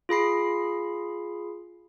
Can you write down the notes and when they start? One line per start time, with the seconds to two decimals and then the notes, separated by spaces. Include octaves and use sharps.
0.09 F4 G#4 B5 C7